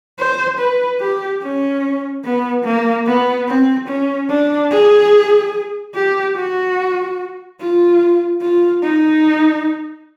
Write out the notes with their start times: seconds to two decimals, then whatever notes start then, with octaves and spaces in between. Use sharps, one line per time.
0.19 C5
0.59 B4
1.00 G4
1.42 C#4
2.25 B3
2.65 A#3
3.07 B3
3.48 C4
3.89 C#4
4.30 D4
4.71 G#4
5.95 G4
6.36 F#4
7.60 F4
8.41 F4
8.83 D#4